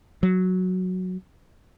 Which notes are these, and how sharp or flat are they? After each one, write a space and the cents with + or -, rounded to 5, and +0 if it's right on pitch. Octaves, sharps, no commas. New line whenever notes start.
F#3 -5